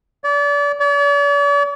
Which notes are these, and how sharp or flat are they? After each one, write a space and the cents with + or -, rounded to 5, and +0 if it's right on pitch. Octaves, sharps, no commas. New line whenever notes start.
D5 -35
D5 -45